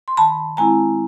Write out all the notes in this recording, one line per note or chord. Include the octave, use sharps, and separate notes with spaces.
C6
D#3 A5 B5
G#3 C4 E4 G#5 A#5